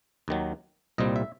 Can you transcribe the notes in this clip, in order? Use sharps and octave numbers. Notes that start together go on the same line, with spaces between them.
D#2 D#3 F#3
C2 A#2 G3 C4 D#5
E5